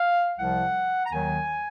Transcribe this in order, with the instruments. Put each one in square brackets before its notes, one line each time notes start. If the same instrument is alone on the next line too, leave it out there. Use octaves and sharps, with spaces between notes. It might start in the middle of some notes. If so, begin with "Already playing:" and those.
Already playing: [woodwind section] F5
C2 C3 F3 F#5
A#5
D#2 D#3 F#3 G#5